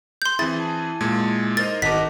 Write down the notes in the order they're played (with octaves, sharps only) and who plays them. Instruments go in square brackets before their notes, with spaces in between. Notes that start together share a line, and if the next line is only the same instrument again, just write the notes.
[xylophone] C6 G6
[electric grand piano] E3 C4 G#4 [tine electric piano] E4 [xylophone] A6
[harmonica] G#5 A5
[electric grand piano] A#2 G#3 G#6
[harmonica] D#4 [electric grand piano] A#4 C5 D#5 [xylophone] A6
[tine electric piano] G#1 [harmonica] D#4 F#4 A#4 [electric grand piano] F#5 A5 D6 [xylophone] B6